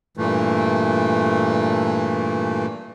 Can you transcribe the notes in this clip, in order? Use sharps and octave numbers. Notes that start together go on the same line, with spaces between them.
G2 A#2 E3 A3